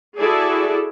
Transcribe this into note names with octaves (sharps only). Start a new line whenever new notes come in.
E4 F#4 G#4 A4 D5